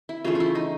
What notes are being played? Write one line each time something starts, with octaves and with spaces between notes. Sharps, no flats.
E4
C#3 E3 A3 F4
E4 F4
D#4